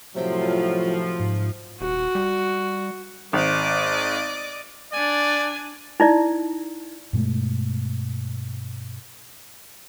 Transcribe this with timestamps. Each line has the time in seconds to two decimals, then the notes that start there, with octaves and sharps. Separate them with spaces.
0.16 A2 C3 F3 F#3 F4 G5
1.19 G#2
1.81 D#1 F#4
2.15 G3
3.33 G#1 D5 D#5 D6
4.93 D4 D5 G#5
6.00 D#4 E4 D5
7.13 G2 B2 G#3 A3